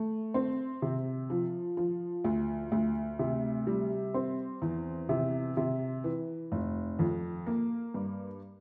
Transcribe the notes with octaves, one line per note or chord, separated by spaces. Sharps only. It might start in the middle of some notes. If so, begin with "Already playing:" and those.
Already playing: A3
C4
C3
F3
F3
D2
D2
C3
G3
C4
E2
C3
C3
E3
F1
F2
A#3
G2